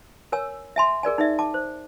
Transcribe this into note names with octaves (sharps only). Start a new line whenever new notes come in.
A#4 C#5 G#5 E6
E5 G#5 C6
G#4 A#4 D5 G#5
D#4 G#4 D5 E5
A5 D6
C5